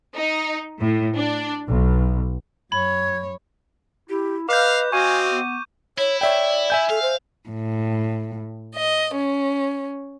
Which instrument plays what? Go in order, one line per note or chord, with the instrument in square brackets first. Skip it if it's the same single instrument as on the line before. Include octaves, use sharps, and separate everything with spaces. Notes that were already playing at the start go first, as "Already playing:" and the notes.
[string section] D#4
A2
D4
B1
[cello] F#2 C#5 [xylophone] B5 [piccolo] G#6
[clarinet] E4 [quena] G4
[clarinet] B4 [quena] D#5 [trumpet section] F5 [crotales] D6 G6
[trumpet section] C4 D#5 F5 [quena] F#4 [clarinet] G#5 [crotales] C#6 D#7
[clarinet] B3
[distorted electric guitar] E4 [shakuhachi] C#5
[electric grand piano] C#5 E5 G5 [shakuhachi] D5
[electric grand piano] E5 G#5 G6
[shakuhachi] A4 [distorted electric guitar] F5
[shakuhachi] C5
[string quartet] A2
D#5
C#4